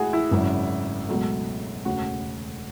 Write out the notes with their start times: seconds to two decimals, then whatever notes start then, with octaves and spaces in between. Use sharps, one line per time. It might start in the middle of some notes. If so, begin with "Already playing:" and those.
Already playing: A1 A2 G#3 E4 F#4 G#4
0.13 E4
0.31 G#1 F#2 C#3 F#3
1.09 C#2 B2 F#3 A3
1.85 E1 D2 C#3 F#4